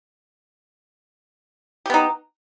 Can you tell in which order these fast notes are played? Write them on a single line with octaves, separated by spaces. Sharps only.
G4 B3 D#4